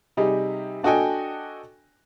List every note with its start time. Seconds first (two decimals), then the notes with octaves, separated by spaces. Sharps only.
0.17 C3 G3 D#4 G#4
0.83 D4 F#4 A4 D#5 G5 G#5